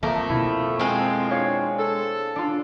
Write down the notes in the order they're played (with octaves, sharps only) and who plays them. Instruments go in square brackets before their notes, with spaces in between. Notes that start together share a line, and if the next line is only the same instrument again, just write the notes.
[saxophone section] F2 [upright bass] D3 [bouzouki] A3 [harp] A#3
[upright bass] B2 [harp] E4
[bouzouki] G#3 C4
[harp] D4 C#5 F5
[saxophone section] A4
[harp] D4 F4